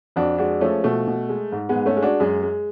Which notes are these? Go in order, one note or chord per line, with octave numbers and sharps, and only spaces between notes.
F2 D4 F#4
G#3 D4 F#4
F3 A3 C#4
B2 A3
B2
G#3
G#2
G#3 B3
G#2
A3 C#4
G#3
D4 F#4
F#2 G#3
G#3